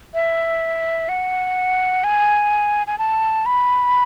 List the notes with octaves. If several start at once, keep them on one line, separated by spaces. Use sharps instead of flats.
E5
F#5
G#5
G#5
A5
B5